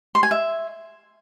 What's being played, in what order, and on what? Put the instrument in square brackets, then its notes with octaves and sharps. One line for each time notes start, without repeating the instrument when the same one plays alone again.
[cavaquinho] C6
G#5
E5